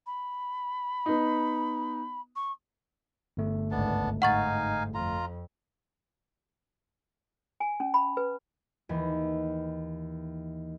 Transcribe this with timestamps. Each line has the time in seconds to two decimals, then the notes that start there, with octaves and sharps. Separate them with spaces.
0.06 B5
1.06 B3 D#4
2.35 C#6
3.37 G1 A3
3.71 G#1 C#2 B3 D4 A5
4.22 G#2 D#4 F5 F#5 G#5 C#6 A6
4.94 F2 F4 A#5
7.60 G#5
7.80 C#4
7.94 B5
8.17 B4
8.89 D#2 E3